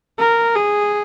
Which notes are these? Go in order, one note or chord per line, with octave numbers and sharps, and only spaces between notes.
A#4
G#4